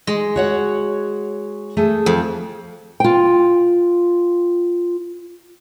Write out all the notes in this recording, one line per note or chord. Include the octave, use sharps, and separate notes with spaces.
G#3
F#4 C#5 F#5
A3 G#4 A4
F2
F4 G5